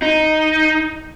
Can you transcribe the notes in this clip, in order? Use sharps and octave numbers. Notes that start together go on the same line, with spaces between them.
D#4